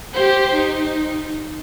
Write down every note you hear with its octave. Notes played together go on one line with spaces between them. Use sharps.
G4 C5
D#4